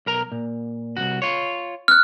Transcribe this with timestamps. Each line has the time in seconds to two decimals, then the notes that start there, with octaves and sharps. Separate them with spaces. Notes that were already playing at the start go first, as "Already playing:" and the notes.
0.06 B1 A#4 A#5
0.32 A#2
0.97 C2 F2 F#4
1.22 F4 C#5
1.88 F6 F#6